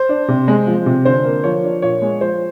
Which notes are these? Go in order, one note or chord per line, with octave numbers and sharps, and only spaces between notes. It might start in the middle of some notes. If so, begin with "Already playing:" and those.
Already playing: C5
D4
C3
G#3
F3
C3
D3 C5
A#3
F3 C#5
D4
A#2 C#5
G#3
F3 C5